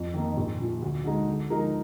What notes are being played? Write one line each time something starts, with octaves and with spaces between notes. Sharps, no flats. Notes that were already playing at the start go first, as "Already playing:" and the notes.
Already playing: F2
D#3 A#3 D#4
A#1
A#2 F3
D2
D3 G#3 D#4
D3
F3 G#3 D#4 A#4